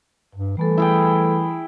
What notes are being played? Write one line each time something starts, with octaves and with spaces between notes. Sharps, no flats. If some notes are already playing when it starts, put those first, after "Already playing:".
G2
E3 G3 A3 A4
E4 G#4 G5